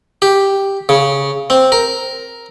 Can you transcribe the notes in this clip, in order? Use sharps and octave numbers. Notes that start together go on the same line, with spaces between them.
G4
C#3
C4
A#4